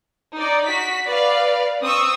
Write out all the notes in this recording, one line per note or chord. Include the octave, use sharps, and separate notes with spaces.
D#4 D5
F#4 B6
B4 D5 F5
C4 C#6 D#6 E6